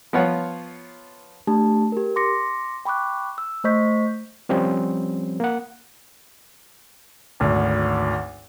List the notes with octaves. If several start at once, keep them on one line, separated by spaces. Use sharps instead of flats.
F3 B3 F4 C#5 F#5
A3 D4 G4 A5
G4 A#4
C6 D6 A#6 C#7
G5 B5 C#6 D6 F#6
E6
A3 C5 D#5 C#6 G6 B6
F3 G3 C4 C#4
A#3 F#5
G#1 D2